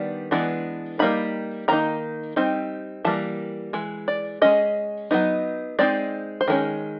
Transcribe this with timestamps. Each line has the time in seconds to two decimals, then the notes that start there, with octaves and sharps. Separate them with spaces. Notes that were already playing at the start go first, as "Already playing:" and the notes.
Already playing: D#3 G3 B3 D4
0.31 E3 G#3 B3 D4
0.99 G3 A#3 D#4 B5
1.68 D#3 G3 A#3 D#4 A#5
2.36 G3 C4 D#4
3.05 E3 G3 A#3 A5
3.73 E3 G#3
4.08 D5
4.42 G#3 C#4 D#5
5.11 F#3 B3 D#4
5.79 G#3 C4 D#4 D5
6.41 C5
6.48 D#3 G#3 C#4